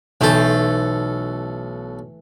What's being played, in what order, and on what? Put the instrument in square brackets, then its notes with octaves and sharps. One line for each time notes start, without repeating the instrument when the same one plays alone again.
[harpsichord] B1 A4 [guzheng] E3 A3 C5